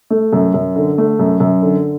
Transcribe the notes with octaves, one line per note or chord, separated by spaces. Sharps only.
A3
F#2
F#2
D3
A3
F#2
F#2
D3